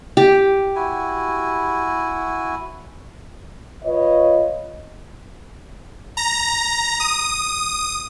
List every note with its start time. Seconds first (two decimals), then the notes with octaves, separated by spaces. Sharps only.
0.17 G4
0.76 E4 F#4 G#5
3.84 F4 B4 C#5 D#5
6.17 A#5
7.00 D#6